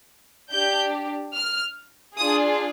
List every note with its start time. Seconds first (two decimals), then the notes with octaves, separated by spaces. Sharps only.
0.51 D4 G4 G6
1.34 F6
2.17 D4 F4 G#4 D#6